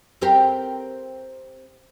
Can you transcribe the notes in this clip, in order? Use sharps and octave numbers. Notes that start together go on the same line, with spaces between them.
C4 G4 A#4